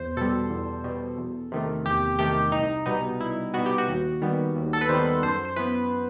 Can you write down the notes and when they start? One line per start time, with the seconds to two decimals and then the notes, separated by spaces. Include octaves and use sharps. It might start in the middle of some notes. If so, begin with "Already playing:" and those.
Already playing: E2 C5
0.17 B2 G3 A4
0.50 E2
0.84 B2 G3
1.18 E2
1.52 C3 D#3 A3
1.85 E2 G4
2.19 C3 D#3 A3 G4
2.52 C2 D#4
2.86 B2 G3 B3 D#4
3.19 C2 E4
3.54 B2 G3 B3 F#4
3.66 G4
3.78 F#4
3.88 D#2
4.21 D#3 G3 B3
4.56 D#2
4.73 A4
4.81 B4
4.89 D#3 G3 B3 C5
5.22 F#2 C5
5.45 C5
5.56 E3 B3 B4